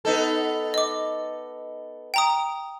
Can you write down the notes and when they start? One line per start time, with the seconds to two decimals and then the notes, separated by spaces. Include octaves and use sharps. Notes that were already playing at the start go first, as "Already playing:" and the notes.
0.05 B3 D#4 A4
0.74 D#5 D6
2.14 G5 A#5 D#6